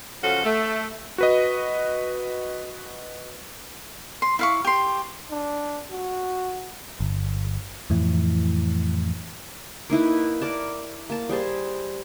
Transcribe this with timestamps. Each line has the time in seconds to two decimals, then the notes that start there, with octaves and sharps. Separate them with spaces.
0.22 C#3 F3 F#3 F#4 A4
0.45 A3
1.18 F#4 B4 D#5
4.22 C6
4.39 E4 F5 C#6
4.64 G4 C6
5.30 D4
5.91 F#4
7.00 G1
7.90 F2 A2 E3
9.90 A#3 D#4 E4 B4
10.41 A#4 D5 A5 B5
11.10 A#3 A5
11.29 G3 G#4 C5 A5